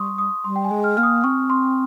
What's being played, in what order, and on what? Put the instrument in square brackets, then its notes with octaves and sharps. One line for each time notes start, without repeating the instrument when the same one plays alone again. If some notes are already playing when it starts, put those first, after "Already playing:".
Already playing: [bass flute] G3 [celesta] C6 C#6 D#6
[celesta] D#6
[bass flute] G3 [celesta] C6
[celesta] G5
G#5
[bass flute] G#3
[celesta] F6
[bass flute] A#3 [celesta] F6
[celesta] D#6
[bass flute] C4 [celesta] C#6
[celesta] C6